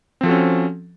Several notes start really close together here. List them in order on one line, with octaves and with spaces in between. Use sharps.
C4 F3 A4 F#4 C#4